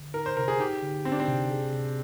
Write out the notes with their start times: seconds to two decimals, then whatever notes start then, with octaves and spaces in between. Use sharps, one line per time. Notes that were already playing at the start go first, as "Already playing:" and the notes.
Already playing: D3
0.14 D#4 A#4
0.26 C5
0.37 C3 A#4
0.48 G#4
0.60 D#4 G4
0.82 D3
1.05 C4 D#4
1.12 D4
1.20 C4
1.28 C3
1.51 G#4
1.73 C3